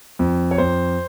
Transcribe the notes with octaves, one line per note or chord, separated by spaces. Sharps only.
F2
C#5
F2 C5